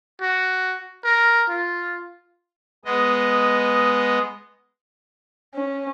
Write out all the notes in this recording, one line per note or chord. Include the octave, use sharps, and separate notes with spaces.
F#4
A#4
F4
G#3 B3 D#5
C#4